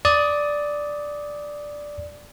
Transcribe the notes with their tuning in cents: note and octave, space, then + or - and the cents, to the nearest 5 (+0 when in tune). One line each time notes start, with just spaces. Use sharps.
D5 +0 D#6 +15